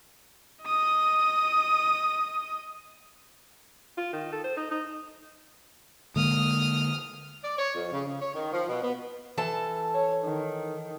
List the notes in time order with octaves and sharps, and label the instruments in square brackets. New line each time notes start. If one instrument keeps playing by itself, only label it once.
[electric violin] D#5 D#6
[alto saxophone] F4
D#3
A4
C5
D#4
D#4
[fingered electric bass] D3 G#3 A#3 [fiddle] D#6 F6
[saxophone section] D5
C#5
F2
C#3
C#3
C#5
D#3
F3
B2
B3
[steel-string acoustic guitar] E3 A4 A5
[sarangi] C#5
D#3